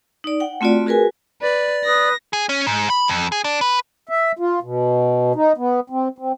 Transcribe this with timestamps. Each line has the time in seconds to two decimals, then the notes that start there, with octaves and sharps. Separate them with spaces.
0.24 D#4 D5
0.40 F#5 G5
0.61 A3 C4 F4 F#4 D5
0.86 F#4 G#4 A#4 B4 G#5
1.42 B4 D5
1.85 B4 D#6 A#6
2.33 G#4
2.49 C#4
2.67 G#2
2.90 B5
3.08 F2
3.32 G#4
3.44 D4
3.61 B4
4.09 E5
4.39 F4
4.63 B2
5.35 D#4
5.58 B3
5.90 C4
6.18 C4